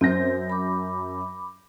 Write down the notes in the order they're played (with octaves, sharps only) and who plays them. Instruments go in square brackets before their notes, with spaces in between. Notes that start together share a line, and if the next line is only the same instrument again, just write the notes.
[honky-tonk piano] F#2 G6 A#6 [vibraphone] C4 C5
[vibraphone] B5 D6